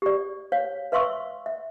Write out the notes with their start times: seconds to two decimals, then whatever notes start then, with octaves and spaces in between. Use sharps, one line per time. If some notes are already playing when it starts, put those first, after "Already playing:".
0.02 G4 D5
0.52 C#5 F5
0.92 B4 E5 F5 C6 C#6 E6
1.46 E5